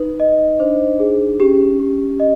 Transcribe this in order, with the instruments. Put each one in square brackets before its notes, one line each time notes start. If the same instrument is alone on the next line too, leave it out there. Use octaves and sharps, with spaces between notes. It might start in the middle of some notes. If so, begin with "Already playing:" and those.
Already playing: [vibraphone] D#4 [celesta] B4
[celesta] D#5
[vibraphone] D4 [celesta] C5
[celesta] G#4
[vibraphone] C#4 [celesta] G4
[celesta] G4
D#5